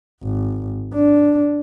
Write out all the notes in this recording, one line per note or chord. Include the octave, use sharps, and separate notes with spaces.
G#1
D4